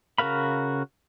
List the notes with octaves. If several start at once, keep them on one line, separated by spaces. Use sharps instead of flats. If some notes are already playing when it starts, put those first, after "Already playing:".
C#3 F#4 A#4 F5 B5